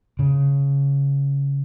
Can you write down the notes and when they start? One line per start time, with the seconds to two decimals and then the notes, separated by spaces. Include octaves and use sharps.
0.19 C#3